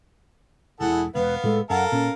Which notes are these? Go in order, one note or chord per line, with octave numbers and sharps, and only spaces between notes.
E1 E4 G#4 A4 F#5
E1 B3 B4 F5
A2 G#3 A4
F#2 A4 A#4 F5 F#5
A#2 C#4